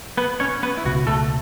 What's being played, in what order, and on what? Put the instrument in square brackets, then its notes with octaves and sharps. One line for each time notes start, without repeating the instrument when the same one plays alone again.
[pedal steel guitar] B3 B4
C#4 C#5
B3 B4
E4
[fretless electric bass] C#2 B2 B3 [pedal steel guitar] F#4
[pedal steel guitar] A3 A4